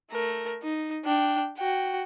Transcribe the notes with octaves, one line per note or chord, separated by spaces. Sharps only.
A3 A#4
D#4
D4 G5
F#4 G5